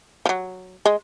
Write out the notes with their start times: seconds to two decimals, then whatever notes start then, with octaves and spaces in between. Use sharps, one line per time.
0.26 F3
0.29 F#3
0.86 G#3